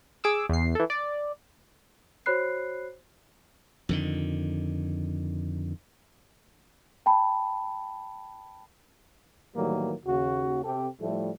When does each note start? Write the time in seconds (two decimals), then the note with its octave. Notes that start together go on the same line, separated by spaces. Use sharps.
0.24 G#4 D6 E6
0.49 E2 C7
0.75 E3 A4
0.90 D5
2.26 F#4 C5 C#5 B5 F#6 C7
3.89 F2 D3 D#3
7.06 G5 A5 B5
9.56 A2 D#3 E3 F#3 G3 A#3
10.06 D#2 C#3 F#4
10.64 C3 C4 G4 A4
11.01 A2 F3 G3 A3